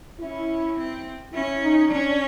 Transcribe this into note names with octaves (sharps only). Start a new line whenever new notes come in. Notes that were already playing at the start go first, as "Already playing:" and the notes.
C#4 E4
C4
C#4 E4
D#4
C#4 D4